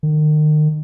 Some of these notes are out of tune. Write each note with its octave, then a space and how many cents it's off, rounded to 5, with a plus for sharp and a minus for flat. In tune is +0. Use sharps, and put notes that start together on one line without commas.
D#3 -35